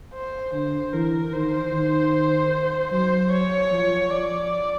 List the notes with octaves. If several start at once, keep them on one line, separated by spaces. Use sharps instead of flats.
C5
D3 C5
E3 A#4
D#3 C5
D#3
F#3 C5
C#5
F3
F3 D5